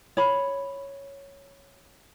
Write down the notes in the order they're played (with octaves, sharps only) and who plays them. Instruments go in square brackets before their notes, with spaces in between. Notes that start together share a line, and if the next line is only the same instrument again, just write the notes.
[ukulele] C#5 B5